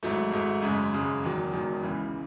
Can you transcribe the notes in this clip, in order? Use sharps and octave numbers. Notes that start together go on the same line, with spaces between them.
G#1 G#2 F#3 A3
G#1 G#2 F#3 A3
G#1 F#2 C#3 G#3
G#1 F#2 C#3 G#3
E1 E2 D#3 F#3
E1 E2 D#3 F#3
C#2 C#3 E3